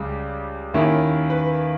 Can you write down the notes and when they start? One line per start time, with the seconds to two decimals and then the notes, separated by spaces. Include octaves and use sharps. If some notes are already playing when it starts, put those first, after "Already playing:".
Already playing: C#2 C#3 G3
0.74 D#2 D#3 A#3 C#4 E4
1.30 B4